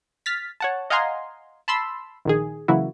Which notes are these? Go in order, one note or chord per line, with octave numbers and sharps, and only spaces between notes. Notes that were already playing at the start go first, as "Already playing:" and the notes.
F6 A6 B6
C#5 F#5 A5
D#5 F5 F#5 G#5 A#5 C6
A5 B5 C6 E6
A#1 D#3 G#4
C#3 E3 F#3 A#3 E4 F#4